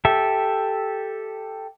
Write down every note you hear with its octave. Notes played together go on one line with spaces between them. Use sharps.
G4 A4 E5